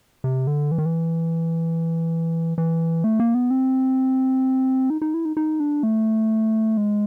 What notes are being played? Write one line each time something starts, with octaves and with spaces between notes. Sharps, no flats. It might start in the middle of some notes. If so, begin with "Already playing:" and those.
C3
D3
E3
D#3
E3
E3
A3
A#3
B3
C4
D#4
D#4
E4
D#4
D#4
D4
A3
G#3